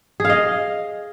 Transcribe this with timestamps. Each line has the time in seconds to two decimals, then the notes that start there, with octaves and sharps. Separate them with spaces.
0.20 G#4
0.25 F5
0.30 D#5